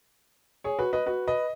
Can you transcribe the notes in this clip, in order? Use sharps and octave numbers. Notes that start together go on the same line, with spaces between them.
G#4 C#5
F#4 B4
B4 D#5
F#4 B4
B4 D#5